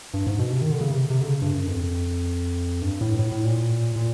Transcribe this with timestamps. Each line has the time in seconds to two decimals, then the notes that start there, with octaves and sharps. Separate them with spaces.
0.14 G2
0.27 G#2
0.39 B2
0.52 C3
0.62 D#3
0.71 D3
0.81 C#3
0.91 C3
1.10 C3
1.21 D3
1.28 C#3
1.42 G2
1.54 F#2
1.67 F2
2.82 G2
3.01 A2
3.19 A2
3.32 A2
3.45 A#2
3.96 A#2